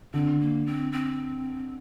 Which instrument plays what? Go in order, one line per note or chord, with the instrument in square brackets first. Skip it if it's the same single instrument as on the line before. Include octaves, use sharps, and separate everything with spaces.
[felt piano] D3 [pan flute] C4
[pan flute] A#3
C4
C4